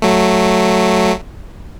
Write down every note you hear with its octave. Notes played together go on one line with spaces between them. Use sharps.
F#3 A3